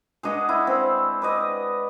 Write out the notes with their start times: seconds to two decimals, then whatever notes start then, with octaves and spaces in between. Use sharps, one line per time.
0.23 G#3 D4 D#5 F#5
0.49 E4
0.67 C4
1.22 B4 D5 D#5